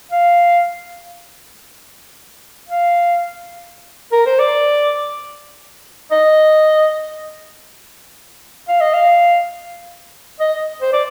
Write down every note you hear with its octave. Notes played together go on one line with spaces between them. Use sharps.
F5
F5
A#4
C5
D5
D#5
F5
D#5
F5
D#5
C5
D5